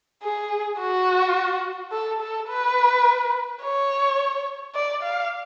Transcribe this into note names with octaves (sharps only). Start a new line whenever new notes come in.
G#4
F#4
A4
A4
B4
C#5
D5
F5